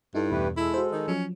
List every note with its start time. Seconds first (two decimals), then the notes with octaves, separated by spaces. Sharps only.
0.15 G2 D#4 E4 A4
0.30 E2 B2 A3 G4 B4
0.57 G#3 E4 A4
0.74 F#4 C5
0.92 D#3 D#5
1.08 F3 F#3 C#4